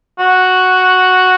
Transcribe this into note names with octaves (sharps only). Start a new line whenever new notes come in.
F#4